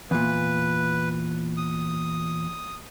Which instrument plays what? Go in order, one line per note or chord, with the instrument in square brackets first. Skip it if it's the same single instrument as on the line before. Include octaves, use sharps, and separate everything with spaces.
[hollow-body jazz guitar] E2 A#2 [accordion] B4
[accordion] D#6